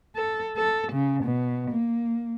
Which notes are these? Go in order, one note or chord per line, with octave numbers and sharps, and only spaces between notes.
A4
A4
C#3
B2
A#3